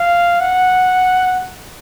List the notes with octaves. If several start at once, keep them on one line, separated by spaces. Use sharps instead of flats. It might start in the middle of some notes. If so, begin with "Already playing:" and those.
Already playing: F5
F#5